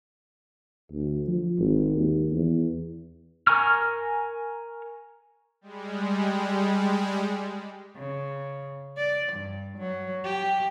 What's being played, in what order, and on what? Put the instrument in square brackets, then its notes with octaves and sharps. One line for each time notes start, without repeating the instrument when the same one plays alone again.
[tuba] D2
F3
G#1
D#2
E2
[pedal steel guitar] A#4 G#5 A#5 C#6 F6
[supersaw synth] G3 G#3
[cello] C#3
D5
G2
F#3
G4